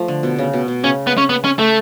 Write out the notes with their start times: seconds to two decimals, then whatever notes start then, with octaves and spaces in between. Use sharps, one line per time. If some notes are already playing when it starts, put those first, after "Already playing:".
Already playing: F3 A3
0.08 D3
0.23 B2
0.38 C#3
0.53 B2
0.68 B2
0.83 C#3 C#4
1.07 B3
1.18 C#4
1.29 B3
1.44 C#4
1.59 A3